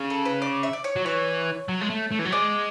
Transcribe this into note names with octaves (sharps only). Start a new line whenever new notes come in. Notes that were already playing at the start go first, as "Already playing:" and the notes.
Already playing: C#3
A4
B4
D5
E5
D5
C#5
F#3
E3 C#5
F#3
G#3
A3
A3
E3
F#3
G#3 D5